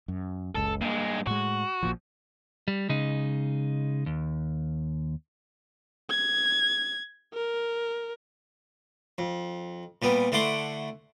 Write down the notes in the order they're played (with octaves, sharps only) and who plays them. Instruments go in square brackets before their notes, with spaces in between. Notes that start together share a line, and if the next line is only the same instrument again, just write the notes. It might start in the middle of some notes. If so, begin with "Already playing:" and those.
[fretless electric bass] F#2
[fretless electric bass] F#1 C#2 [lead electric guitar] A4
[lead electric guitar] G2 G#3 [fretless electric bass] A#3
[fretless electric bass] A2 G#3 [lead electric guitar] F#4
[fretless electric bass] A#1 A#2 F3
[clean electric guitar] G3
C#3 G#3 D#4
D#2
[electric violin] G#6
A#4
[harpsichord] F2
A#2 G3 B3
D3 A3 E4 F#5 C6 D6